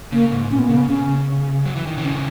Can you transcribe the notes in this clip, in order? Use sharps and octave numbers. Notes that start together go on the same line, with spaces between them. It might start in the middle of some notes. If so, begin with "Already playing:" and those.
C#3 A#3
G#2
A#2 C#4
B3
C#3 A#3
B3
C#3 C#4
F#3
E3
D#3
C#3 E3
C#4